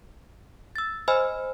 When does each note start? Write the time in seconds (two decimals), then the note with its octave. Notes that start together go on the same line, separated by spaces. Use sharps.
0.76 E6 A6
1.08 C5 D#5 G#5 B5 E6 F6